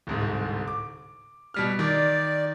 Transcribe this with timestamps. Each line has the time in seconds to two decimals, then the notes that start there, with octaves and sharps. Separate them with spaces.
0.07 D1 C2 G#2
0.68 D6
1.54 B2 G3 F6
1.79 D#3 D5